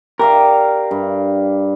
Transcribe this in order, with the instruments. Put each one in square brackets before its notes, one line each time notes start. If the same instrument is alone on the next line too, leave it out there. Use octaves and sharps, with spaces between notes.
[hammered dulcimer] G4 D5 F5 [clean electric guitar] A#4
[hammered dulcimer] G2